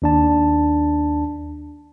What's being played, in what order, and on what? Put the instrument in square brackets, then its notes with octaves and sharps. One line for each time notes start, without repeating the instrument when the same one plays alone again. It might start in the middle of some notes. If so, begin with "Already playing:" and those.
[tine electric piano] D#2 D4 A5